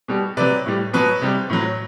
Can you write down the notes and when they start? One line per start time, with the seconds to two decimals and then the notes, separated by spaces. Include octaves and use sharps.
0.08 B2 G3
0.37 C3 F#3 B4 D5
0.66 A2 G3
0.93 B2 F#3 B4
1.21 C3 G3
1.50 A2 F#3